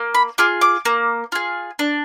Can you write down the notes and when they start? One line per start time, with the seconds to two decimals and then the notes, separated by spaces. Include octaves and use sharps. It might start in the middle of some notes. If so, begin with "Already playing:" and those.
Already playing: A#3
0.14 B5
0.38 F4 G#4 D6
0.61 D6
0.85 A#3
1.32 F4 G#4
1.79 D4